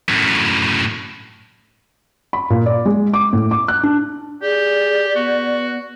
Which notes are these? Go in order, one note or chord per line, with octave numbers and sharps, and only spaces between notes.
F#2 A2
B5
A#2
D5
G#3
D6
A2
D6
F#6
D4
G4 G#4 D5
B3 F#4